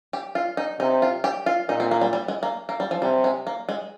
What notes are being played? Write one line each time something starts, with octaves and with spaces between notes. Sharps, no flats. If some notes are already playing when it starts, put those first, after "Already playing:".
G4
F4
D#4
C3 D#4
F4
G4
F4
A#2 D#4
C4
A#3
G3
G3
G#3
A#3
A#3
G3
F3
C3 G3
G#3
A#3
G#3